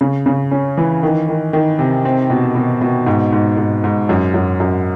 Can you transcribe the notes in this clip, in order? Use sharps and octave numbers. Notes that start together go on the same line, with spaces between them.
C#3
C#3
C#4
E3
D#3
D#3
D#3
C3
C4
B2
B2
B2
G#2
G#2
G#2
G#2
F#2
F#2
F#2